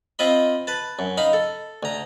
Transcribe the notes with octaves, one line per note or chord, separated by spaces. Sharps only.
C4 F4 D#5 B5
B4 A5
F#2
D#4 F5 B5
A4
D2 A#5